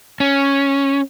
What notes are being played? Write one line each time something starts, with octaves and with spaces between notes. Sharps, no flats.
C#4